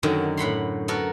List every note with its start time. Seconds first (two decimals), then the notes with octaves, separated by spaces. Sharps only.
0.03 F#2 D3 D#3 F#3
0.37 A2 F#5 B5 C6
0.88 B3 F#4 A4 A#4